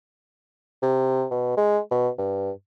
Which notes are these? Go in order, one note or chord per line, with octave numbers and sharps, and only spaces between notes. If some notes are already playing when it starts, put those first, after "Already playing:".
C3
B2
G#3
B2
G2